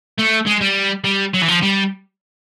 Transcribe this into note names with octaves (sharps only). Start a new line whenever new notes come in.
A3
G#3
G3
G3
F#3
E3
F3
G3